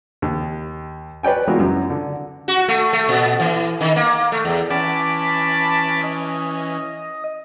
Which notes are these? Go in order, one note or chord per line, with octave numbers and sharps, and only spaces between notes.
D#2
B4 C#5 D5 G5 G#5
E3 G#3 B3 F4 F#4 A#4
F#2
D3
F#4
A3
A3
A#2
E3
D#3
A#3
A3
E2
E3 C#4 A5 B5 D6
D#5